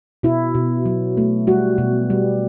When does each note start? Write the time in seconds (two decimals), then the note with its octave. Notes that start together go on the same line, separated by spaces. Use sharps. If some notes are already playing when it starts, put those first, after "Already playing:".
0.23 B2 E4
0.55 B2
0.86 F#3
1.17 A3
1.47 G3 F#4
1.78 B2
2.10 G3